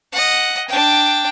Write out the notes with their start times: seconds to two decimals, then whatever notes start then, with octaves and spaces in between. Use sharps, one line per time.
0.12 D#5 F#5
0.68 D4 G5